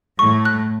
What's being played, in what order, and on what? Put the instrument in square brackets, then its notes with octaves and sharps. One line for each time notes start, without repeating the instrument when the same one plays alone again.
[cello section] A2 A3 [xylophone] C#6
[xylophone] F#6